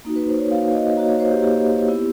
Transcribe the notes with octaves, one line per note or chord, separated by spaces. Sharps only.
A#3 D#4 F#4
B4
C5
C#5
A#3 D#4 F#4 F5
D#5
A#3 D#4 F#4 C#5
C#5
C5
G4
A#3 D#4 F#4 G4
B3 E4